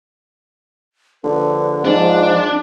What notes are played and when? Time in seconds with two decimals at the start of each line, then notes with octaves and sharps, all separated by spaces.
1.24 A#1 D3 B4
1.85 G#2 F3 D4